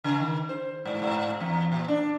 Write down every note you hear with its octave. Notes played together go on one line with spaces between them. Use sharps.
C#3
D#3
C5
G#2
G#2
E2
A#2
D4